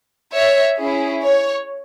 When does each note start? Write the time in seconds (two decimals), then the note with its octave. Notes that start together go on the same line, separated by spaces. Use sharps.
0.35 C#5 E5
0.79 C#4 E4 G#4
1.24 C#5